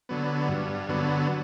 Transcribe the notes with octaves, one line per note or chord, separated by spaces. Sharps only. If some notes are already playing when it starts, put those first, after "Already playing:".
D3 F#3 B3
G2
D3 F#3 B3